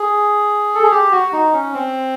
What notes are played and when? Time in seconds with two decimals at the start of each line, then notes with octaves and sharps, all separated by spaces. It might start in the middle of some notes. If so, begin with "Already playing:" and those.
Already playing: G#4
0.75 A4
0.83 G#4
0.91 G4
1.11 F#4
1.33 D#4
1.53 C#4
1.74 C4